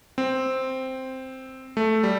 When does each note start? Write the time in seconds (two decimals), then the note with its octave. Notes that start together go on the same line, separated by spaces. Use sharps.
0.18 C4
1.77 A3
2.03 G3